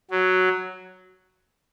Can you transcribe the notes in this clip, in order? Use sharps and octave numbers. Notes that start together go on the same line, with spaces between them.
F#3